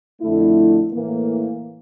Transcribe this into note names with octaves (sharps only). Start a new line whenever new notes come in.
F2 D3 A3 E4
A2 E3 A#3